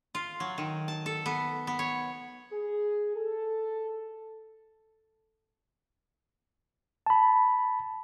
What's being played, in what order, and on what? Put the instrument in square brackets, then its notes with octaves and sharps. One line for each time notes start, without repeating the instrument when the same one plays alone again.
[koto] F4
F#3
D#3
A5
A4
B3
B3
C#5
[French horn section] G#4
A4
[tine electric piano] A5 B5